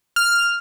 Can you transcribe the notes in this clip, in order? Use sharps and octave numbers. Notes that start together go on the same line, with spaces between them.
F6